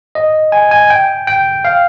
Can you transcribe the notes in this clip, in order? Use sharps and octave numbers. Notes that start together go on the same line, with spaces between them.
D#5
G#5
G#5
G5
G5
F5